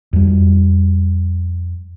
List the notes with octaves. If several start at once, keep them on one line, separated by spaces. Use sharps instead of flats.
F2 G3